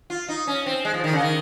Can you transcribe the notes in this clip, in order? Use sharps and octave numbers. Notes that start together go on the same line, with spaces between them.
F4
D#4
C#4
C4
G#3
F3
D#3
C#3
D#3